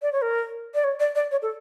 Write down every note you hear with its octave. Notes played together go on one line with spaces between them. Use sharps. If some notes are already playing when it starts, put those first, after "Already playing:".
D5
C#5
A#4
D5
C#5
D5
D5
C#5
A4